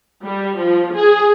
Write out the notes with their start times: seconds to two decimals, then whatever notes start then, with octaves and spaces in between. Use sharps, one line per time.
0.23 G3
0.56 F3
0.94 G#4